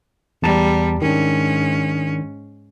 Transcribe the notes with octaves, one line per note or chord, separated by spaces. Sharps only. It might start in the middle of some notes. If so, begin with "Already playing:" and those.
E2 G3 A5 A#5
G#2 D#3 C#4 D4